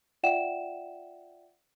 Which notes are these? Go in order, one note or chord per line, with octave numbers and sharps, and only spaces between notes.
F4 D5 E5 F#5 G5 E7